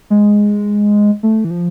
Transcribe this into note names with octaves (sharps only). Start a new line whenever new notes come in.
G#3
A3
E3
F3